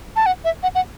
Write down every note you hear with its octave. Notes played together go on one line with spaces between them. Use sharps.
A5
F#5
E5
F#5
F#5